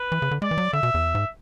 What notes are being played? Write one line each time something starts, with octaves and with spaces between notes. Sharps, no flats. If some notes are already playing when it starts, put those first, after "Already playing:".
Already playing: B4
E3
C#3
D3
G#3 D5
E3
F#3
D3 E5
B2
E2
G#2